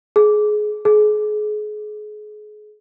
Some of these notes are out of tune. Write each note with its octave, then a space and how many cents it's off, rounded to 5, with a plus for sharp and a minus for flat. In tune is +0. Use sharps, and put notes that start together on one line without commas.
G#4 +25
G#4 +35